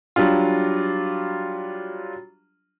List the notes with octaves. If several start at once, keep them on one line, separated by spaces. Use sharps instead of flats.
F#3 G3 D4 F4